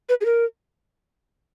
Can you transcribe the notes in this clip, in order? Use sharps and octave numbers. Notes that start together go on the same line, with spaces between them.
B4
G#4
A#4